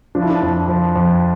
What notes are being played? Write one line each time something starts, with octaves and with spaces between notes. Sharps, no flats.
F3 D4
E4
D4
F2
F3
F2